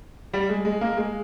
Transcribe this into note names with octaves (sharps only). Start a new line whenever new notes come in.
G3
G#3
G#3
A#3
G#3